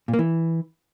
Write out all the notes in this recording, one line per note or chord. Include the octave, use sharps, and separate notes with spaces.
A#2
A#3
E3